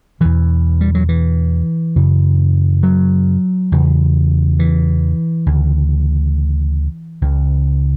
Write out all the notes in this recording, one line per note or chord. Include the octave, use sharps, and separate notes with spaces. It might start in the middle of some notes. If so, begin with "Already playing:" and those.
E2 B2 E3
G3
F#3
E3
F#2 C#3
F#3
E2 C#3
E3
D2 C#3
C#2 C#3